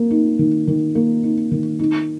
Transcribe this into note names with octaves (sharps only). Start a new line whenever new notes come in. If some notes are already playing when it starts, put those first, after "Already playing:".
Already playing: A#3
D#4
D#3
D#3
A#3
D#4
D#3
D#4